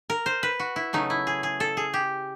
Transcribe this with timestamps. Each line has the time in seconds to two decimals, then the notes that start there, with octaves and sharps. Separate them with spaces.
0.10 A#4
0.26 C5
0.43 B4
0.59 F#4
0.76 E4
0.93 C#3 F#3 A3 D#4
1.10 E4
1.27 G#4
1.43 G#4
1.60 A4
1.77 G#4
1.94 G4